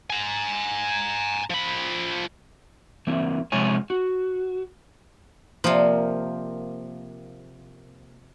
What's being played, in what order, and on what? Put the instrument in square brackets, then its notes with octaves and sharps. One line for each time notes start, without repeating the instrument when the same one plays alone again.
[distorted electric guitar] G#5 A#5
F3 B5
[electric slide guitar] E3 A#3 C4
C3 F3 G#3 C#5 G#5
F#4
[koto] C3 F3 [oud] A#3 D5